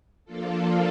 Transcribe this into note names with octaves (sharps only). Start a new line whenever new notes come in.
F3 A#3 D4 F4 A4